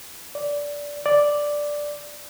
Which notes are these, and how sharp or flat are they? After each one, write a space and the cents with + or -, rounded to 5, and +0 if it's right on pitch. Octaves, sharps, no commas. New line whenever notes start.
D5 -15
D5 +0